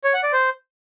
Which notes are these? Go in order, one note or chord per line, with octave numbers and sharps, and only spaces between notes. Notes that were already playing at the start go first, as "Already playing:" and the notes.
C#5
F#5
D5
C5